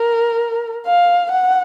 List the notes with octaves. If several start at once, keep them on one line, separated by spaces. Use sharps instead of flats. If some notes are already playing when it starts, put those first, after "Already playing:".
Already playing: A#4
F5
F#5